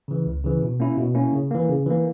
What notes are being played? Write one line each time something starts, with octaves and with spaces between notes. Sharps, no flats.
C#3 E3
C#2
C#3 E3
B2
A#3 C#4 E4
B2
A#3 C#4 E4
C#3
E3 A#3
C#3
E3 A#3